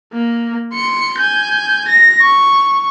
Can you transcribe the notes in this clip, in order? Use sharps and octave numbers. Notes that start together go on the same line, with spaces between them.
A#3
C6 C#7
G#5 G6
A#6
C#6